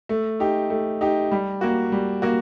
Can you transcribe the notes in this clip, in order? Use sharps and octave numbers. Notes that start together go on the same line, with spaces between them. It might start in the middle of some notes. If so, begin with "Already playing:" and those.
A3
D#4 G4
A3
D#4 G4
G3
A#3 F#4
G3
A#3 F#4